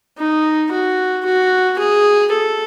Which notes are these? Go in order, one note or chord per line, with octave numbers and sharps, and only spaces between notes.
D#4
F#4
F#4
G#4
A4